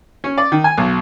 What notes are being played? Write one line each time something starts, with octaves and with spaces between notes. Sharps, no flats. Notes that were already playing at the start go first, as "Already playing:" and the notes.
C#4
D5
D#3
G#5
B1